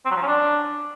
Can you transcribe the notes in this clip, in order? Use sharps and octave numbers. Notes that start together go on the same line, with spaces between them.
C4
F#3
F3
C#4
D4